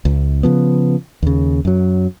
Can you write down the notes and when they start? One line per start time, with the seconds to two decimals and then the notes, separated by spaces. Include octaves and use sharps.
0.05 C#2
0.43 C#3 F3 B3
1.23 D#2 C#3
1.65 F#2 F#3